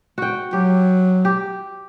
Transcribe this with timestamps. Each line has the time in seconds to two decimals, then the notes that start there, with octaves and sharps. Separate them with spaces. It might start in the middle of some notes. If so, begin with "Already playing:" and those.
0.18 F#4 G5
0.53 F#3 G4
1.25 G4